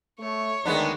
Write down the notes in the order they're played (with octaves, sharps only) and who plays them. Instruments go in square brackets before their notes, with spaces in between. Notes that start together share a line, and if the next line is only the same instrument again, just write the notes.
[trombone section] A3 [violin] C#5
[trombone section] D2 D#3 [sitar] G#3 B3 D4